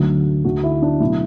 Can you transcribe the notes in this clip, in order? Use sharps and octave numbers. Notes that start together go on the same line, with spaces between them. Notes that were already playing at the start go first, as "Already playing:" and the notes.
Already playing: D2 D3 F#3 A3
D2 D3 A3 F#4
E4
D4
B2 F#3 A3 E4